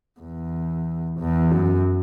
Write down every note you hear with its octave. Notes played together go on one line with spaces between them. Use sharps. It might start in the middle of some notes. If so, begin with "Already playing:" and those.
E2
E2
F#2